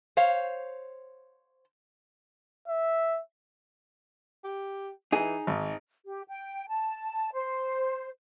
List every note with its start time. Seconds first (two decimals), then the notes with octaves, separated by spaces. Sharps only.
0.17 C5 C#5 F5
2.68 E5
4.44 G4
5.12 E3 D#4 G#4
5.47 G#1 D#5
6.07 G4
6.28 G5
6.68 A5
7.34 C5